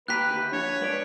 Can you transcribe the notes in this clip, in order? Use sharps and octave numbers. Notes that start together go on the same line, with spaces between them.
D#2 G4 B4 A#5 F#6 B6
D2 G4
F3 D4 C#5
G#3 B4 D5